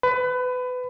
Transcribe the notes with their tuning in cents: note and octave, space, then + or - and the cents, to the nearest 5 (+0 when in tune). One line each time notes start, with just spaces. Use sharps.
B4 +25